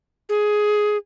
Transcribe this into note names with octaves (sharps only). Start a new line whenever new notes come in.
G#4